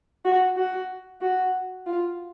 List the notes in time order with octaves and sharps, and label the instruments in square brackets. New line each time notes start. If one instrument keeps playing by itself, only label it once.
[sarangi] F#4
F#4
F#4
F4